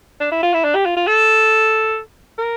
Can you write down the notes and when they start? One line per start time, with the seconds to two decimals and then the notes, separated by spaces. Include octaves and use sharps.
0.20 D4
0.32 E4
0.43 F4
0.54 E4
0.64 D4
0.75 G4
0.86 F4
0.97 F4
1.08 A4
2.38 A#4